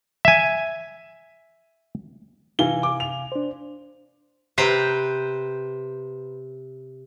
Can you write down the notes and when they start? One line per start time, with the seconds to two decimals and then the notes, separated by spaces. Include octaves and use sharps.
0.25 E5 G#5
2.59 C3 E3 F5 G#5 G7
2.83 D6
3.00 F7
3.32 D4 C5
4.57 C3 B4 C5 G5 A#5